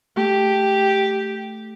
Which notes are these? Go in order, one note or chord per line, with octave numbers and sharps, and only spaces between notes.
A3 G4